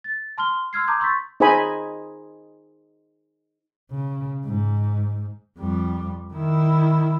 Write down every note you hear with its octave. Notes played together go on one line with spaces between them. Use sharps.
A6
A5 C6 F6 G7
C6 E6 F6 G#6 C7
A5 A#5 D6 D#6 G6 G#6
C6 C#6 E6 G6 A6 B6
D#4 G#4 C5 D#5 G#5 B5
C#3
G#2
F2 G3
D#3 E4